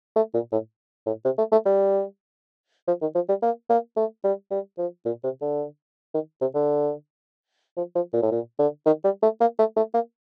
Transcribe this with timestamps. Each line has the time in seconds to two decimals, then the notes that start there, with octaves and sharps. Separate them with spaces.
0.16 A3
0.34 A#2
0.52 A2
1.06 A2
1.25 C3
1.38 A3
1.52 A3
1.65 G3
2.87 F3
3.02 D#3
3.15 F3
3.29 G3
3.42 A#3
3.69 A#3
3.97 A3
4.24 G3
4.51 G3
4.78 F3
5.05 A#2
5.24 C3
5.41 D3
6.14 D#3
6.41 C3
6.55 D3
7.77 F3
7.95 F3
8.13 A#2
8.22 A2
8.31 A#2
8.59 D3
8.86 D#3
9.04 G3
9.22 A3
9.40 A#3
9.59 A3
9.76 A3
9.94 A#3